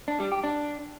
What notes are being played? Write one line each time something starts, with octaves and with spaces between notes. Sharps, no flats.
D4
G3
G4
D4